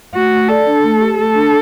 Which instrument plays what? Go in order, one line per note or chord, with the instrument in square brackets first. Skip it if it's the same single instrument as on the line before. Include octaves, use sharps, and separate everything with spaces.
[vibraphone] A3 [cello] F#4
[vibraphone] A3
[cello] A4 [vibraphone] D5
[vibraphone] D4
A3
G4
[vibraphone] A3 [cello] A4
[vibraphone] D4